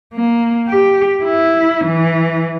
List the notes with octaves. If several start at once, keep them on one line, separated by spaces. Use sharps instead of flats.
A#3
G4
E4
E3